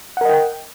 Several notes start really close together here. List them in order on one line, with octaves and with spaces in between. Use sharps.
F#5 A#4 D#5 G5